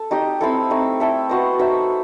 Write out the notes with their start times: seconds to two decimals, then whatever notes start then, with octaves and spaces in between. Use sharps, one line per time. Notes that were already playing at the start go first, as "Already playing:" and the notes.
Already playing: A4
0.11 D#4 G4 D#5
0.41 C4 E4 A4
0.70 A3 C4 D#4
1.00 E4 A4 E5
1.29 B3 F#4 C5 D#5
1.59 D#4 F#4 C5 E5